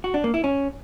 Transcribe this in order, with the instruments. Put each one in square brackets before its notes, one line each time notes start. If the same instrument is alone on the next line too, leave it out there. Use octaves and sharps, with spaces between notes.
[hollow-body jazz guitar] F#4
D4
A#3
E4
C#4